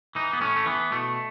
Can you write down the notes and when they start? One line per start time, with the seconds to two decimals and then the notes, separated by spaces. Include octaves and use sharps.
0.15 E3 D#4
0.33 B3
0.41 A2 C#4
0.56 A3
0.66 E3 B3
0.92 B2 A3